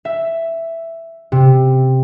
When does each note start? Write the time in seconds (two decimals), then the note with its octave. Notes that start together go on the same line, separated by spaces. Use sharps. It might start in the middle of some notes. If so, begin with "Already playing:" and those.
0.05 E5
1.32 C3